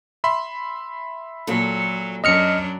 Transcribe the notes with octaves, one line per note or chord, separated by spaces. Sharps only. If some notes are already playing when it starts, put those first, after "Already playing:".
E5 B5 C6
A#2 F#3 A4
F#2 F#3 D4 D#5 F6 C#7